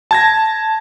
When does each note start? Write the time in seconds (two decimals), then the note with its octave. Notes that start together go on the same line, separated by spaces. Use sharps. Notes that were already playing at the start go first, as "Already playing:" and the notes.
0.11 A5 G#6 A#6